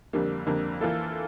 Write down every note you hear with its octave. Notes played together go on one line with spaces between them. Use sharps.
F2 D3 G3 A#3
F2 D3 G3 A#3
E3 A#3 F4 A4